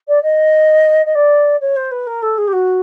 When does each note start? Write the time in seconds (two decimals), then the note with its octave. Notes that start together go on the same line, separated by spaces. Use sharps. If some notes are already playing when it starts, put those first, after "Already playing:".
0.08 D5
0.23 D#5
1.06 D#5
1.15 D5
1.61 C#5
1.77 C5
1.91 B4
2.07 A#4
2.22 A4
2.38 G#4
2.48 G4
2.53 F#4